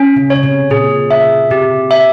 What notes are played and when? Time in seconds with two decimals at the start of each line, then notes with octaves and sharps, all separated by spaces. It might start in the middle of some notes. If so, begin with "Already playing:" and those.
Already playing: C#4
0.16 C#3
0.30 C#3 C#5
0.43 C3
0.70 A#2 G#4
1.11 E5
1.51 C3 G4
1.91 E5